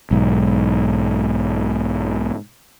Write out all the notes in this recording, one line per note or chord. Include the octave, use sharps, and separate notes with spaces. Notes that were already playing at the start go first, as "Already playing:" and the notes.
B1 G#2